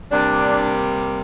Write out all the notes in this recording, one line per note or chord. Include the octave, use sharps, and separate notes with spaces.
C3 G3 A#3 D4